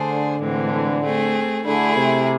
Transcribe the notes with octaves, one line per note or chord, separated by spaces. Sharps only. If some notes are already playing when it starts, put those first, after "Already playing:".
Already playing: D3 A3 D4 G#4 C5
A2 E3 G#3 C4
A3 C4 G#4
D3 A3 E4 G#4
C3